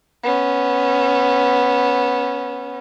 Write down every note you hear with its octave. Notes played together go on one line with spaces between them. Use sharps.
B3 C#4